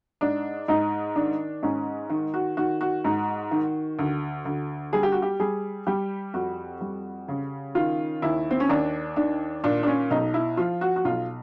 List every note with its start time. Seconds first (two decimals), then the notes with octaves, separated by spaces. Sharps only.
0.21 G#2 D4
0.68 G#2 D#4
1.16 D#3 D4
1.63 G#2 C#4
2.10 D#3
2.34 F#4
2.57 D#3 F#4
2.81 F#4
3.04 G#2
3.51 D#3
3.99 D2
4.45 D2
4.93 G3 G#4
5.03 G4
5.12 F#4
5.22 G4
5.40 G3 G#4
5.87 G3 G4
6.34 F2 F#4
6.81 G3
7.28 C#3
7.75 D#3 F4
8.22 D#2 E4
8.51 C4
8.60 C#4
8.69 D#2 D4
9.16 D#3 D4
9.64 A#2 D4
9.83 D4
9.87 C#4
10.11 B1 D#4
10.34 E4
10.57 F3 F4
10.81 F#4
10.96 F#4
11.05 B1 F4